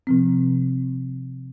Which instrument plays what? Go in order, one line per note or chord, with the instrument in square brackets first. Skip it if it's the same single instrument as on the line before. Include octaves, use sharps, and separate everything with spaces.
[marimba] C3 F3 C4